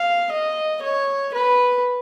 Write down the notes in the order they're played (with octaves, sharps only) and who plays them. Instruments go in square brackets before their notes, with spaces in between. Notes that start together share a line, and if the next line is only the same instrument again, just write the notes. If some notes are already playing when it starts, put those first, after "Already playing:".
Already playing: [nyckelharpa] F5
D#5
C#5
B4